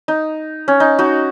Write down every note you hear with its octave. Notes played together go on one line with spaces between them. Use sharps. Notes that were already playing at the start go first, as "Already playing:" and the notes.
D#4
C#4
D#4
D#4 F#4